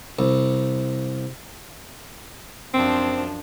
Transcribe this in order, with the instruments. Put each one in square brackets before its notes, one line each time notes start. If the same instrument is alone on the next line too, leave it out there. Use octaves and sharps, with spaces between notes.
[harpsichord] C2
[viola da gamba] F#2 F3 D4 [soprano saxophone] C4